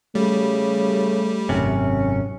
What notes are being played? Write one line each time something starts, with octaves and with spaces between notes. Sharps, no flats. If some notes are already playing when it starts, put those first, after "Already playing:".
C#3 G3 A3
G#1 F#2 C3 C#4